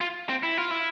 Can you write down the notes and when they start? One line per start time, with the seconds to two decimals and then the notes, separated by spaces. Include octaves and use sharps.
0.01 F4
0.29 C4
0.43 E4
0.57 F4
0.71 E4